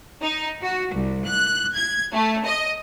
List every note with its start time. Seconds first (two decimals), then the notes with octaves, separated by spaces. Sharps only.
0.21 D#4
0.61 F#4
0.93 C2
1.25 F#6
1.74 G#6
2.12 A3
2.45 D#5